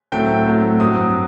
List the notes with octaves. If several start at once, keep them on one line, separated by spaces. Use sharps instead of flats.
A2 F#3 A3 C4 G5
A2 F#3 A3 C4
G2 F#3 C4 D#6